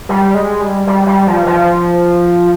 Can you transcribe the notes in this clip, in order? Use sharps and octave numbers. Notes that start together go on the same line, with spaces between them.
G3
G#3
G3
G3
G3
F3
F3